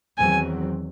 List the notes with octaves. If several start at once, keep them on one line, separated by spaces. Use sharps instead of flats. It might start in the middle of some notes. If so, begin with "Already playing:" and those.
E2 D#3 F#3 C4 G#5